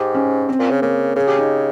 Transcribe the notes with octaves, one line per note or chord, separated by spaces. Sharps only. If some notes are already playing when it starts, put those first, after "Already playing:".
Already playing: G#2 G4
C#4
C4
A#2
C#3
C#3 A#3
C#3 G#4
G4
D#4